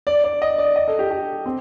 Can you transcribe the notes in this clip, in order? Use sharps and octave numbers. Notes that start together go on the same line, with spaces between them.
D5
D5
D#5
D5
D#5
A4
G4
G4
C4